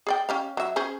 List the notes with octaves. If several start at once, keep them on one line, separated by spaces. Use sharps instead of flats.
G#4 D5 G5
C#4 G4 F5
F#3 E5
C#4 G#4 C5